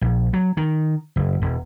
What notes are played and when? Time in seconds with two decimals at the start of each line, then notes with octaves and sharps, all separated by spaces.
0.01 A#1
0.33 F#3
0.57 D#3
1.16 F#1
1.42 E1